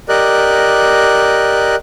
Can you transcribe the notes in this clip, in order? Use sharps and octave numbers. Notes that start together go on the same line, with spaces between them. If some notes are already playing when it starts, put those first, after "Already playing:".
G4 A#4 D5 D#5 F#6